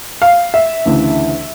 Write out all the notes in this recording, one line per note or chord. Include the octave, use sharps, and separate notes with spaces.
F5
E5
D2 C#3 E3